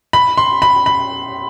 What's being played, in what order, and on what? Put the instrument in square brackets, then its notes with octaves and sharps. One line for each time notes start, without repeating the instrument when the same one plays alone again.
[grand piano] B5
C6
B5
B5